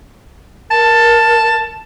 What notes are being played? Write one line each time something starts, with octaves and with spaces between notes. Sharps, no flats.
A#4 A5